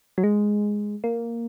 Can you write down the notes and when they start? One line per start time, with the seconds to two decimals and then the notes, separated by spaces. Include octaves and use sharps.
0.18 F#3
0.24 G#3
1.04 A#3